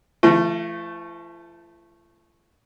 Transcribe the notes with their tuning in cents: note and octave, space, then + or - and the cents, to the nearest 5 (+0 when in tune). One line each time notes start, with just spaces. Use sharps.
F3 -45 A3 +0